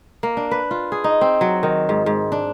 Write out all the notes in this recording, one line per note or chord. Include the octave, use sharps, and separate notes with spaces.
A#3
D4
B4
F4
G#4
D#4
C4
F#3
D#3
G#2
G#2
D4